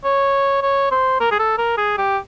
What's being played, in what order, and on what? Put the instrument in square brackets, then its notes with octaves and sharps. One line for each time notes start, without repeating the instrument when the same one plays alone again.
[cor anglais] C#5
C#5
C5
A#4
G#4
A4
A#4
G#4
G4